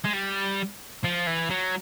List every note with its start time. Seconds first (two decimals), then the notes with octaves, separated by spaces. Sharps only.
0.05 G#3
0.14 G3
1.04 F3
1.27 E3
1.50 F#3